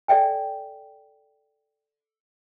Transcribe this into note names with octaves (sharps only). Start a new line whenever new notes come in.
A4 D5 E5 G5 G#5